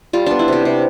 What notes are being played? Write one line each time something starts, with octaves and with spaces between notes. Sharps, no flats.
G3 F4
B3 D4
E4
C3 G4
C3